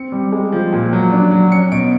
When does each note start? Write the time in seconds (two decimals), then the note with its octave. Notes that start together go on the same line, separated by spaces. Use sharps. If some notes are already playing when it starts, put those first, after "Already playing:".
Already playing: C4 C#7
0.12 G3
0.32 G#3
0.52 F3
0.73 A#2
0.93 F#3
1.12 D4
1.31 F#3
1.52 C#4 C#7
1.72 B2 D7